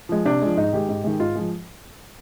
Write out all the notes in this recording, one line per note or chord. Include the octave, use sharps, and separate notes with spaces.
F3 G#3
C3 D4
F3 G#3
G#2 D#4
D#3 G#3 G4
G#2
D#3 G#3
G#2 F4
F3 G#3